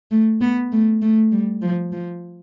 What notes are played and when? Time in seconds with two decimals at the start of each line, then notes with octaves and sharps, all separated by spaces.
0.11 A3
0.41 B3
0.72 A3
1.02 A3
1.32 G3
1.62 F3
1.92 F3